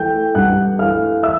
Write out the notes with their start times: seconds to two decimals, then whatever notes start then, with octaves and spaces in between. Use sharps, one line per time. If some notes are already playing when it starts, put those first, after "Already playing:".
Already playing: E3 A3 G5 G6
0.35 G2 F#5 F#6
0.79 E3 A3 F5 F6
1.23 E5 E6